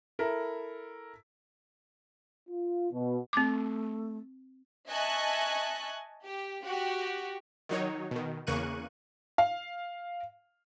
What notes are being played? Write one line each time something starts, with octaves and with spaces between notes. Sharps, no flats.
E4 A4 A#4
F4
B2
A3 C4 D6
D#5 E5 G#5 A5 C#6 F#6
G4
F#4 G4
D#3 F#3 D#4 C#5
B2 D#3
E2 C#3 A#3 C#6 F#6 D#7
F5